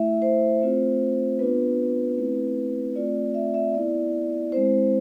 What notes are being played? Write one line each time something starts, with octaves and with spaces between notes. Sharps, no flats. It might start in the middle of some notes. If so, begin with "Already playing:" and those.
Already playing: A3 E4 E5
C5
A3 C4 F4
B3 D4 F4 B4
A3 C4 E4
A3 C4 F4 D5
E5
E5
B3 E4 D5
G#3 C4 E4 C5